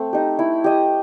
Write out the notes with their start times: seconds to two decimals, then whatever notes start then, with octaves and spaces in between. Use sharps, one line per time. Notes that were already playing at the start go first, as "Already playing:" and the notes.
Already playing: A3 C4
0.13 D#4 G4
0.39 E4
0.64 G4 D#5